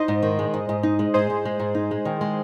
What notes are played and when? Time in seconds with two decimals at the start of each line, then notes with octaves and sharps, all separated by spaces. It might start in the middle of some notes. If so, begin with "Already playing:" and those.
Already playing: D#4 C5 D#5
0.08 G#2
0.22 D#3
0.39 G#3
0.54 G#2
0.69 G#2
0.83 D#4
0.99 G#3
1.14 G#2 G#4 C5
1.30 G#2
1.45 G#3
1.60 G#2
1.75 D#4
1.91 G#3
2.05 D#3
2.21 G#3